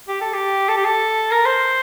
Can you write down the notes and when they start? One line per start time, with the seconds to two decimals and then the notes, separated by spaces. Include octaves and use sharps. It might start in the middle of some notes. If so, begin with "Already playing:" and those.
0.08 G4
0.21 A4
0.34 G4
0.69 A4
0.77 G4
0.85 A4
1.31 A#4
1.46 C5